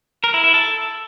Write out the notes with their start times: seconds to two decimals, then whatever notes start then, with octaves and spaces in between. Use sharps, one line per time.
0.24 A#4
0.34 E4
0.44 E4
0.54 A4